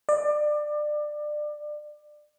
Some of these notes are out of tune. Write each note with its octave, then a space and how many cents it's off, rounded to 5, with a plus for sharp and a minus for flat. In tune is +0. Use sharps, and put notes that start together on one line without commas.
D5 +25